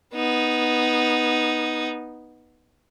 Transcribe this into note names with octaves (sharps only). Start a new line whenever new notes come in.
B3 D#4